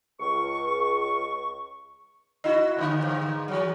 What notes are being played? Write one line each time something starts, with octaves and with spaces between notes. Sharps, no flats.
C#2 C#6
D#4 E4 F#4 D#5
D#2 B2 D3
G#2 D3
E3 F#3